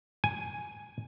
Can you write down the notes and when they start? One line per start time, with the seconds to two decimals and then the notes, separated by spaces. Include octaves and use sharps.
0.24 G#5